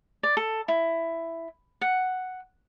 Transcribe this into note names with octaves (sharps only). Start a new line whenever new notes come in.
D5
A4
E4
F#5